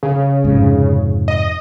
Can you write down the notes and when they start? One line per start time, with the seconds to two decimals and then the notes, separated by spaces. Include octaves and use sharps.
0.03 C#3
0.44 F2 G#2 C3
1.28 D#5